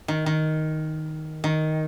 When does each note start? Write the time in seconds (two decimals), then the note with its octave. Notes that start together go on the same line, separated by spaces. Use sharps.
0.08 D#3
0.26 D#3
1.44 D#3